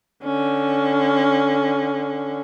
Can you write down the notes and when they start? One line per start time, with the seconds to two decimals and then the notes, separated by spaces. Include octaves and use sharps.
0.24 D3 C#4